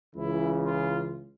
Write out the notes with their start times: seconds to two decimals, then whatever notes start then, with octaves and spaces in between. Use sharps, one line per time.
0.15 C#2 C#3 E3 E4
0.65 F4